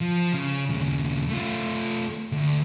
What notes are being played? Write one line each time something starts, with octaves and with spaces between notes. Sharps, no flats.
F3
C#3
D#2 C#3
A3 F4
D2